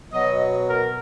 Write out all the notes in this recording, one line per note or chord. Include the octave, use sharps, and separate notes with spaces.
B2 F#3 D#5
A#4